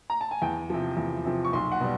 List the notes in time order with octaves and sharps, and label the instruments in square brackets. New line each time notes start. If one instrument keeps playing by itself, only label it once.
[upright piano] A#5
A5
G#5
E2 G5
C3 F3
E2
C3 F3
C#6
B1 C6
F#5
B2 G3